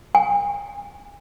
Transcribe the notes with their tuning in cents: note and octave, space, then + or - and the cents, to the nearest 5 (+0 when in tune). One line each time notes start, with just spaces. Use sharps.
G#5 -40